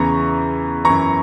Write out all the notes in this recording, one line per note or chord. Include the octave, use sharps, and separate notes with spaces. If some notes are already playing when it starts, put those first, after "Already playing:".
Already playing: E2 C#3 E3 A#5 C#6
F#2 E3 A#5 C#6